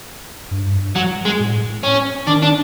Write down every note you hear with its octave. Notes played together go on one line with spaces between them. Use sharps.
G2
F#3
G#3
A2
C#4
D#3 D4
D4